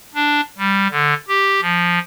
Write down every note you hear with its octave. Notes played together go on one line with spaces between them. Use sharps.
D4
G3
D3
G4
F3